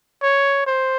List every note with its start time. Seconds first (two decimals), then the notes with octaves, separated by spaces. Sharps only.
0.22 C#5
0.67 C5